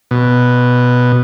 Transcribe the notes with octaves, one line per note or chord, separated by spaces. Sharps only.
B2